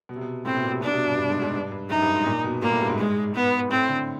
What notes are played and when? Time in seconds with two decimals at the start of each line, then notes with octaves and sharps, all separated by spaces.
0.09 B2
0.16 C3
0.21 B2
0.45 A2 C4
0.55 B2
0.63 A#2
0.73 C3
0.81 B2 D4
0.90 C3
0.94 B2
1.05 G2
1.17 G2
1.30 G#2
1.42 G#2
1.54 G2
1.72 G2
1.89 F#2 D#4
2.02 G2
2.14 G#2
2.26 A#2
2.44 B2
2.62 A#2 A#3
2.71 A2
2.81 G2
2.89 G#2
2.99 G#3
3.34 B3
3.70 A2 C4
3.88 D3